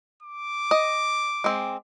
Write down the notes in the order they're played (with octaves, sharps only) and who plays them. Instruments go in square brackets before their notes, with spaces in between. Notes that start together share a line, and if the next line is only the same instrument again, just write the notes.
[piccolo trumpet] D6
[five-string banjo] D#5
G#3 C4